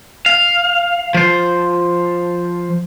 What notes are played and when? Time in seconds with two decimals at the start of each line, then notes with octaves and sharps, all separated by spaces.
0.26 F5
1.14 F3 C5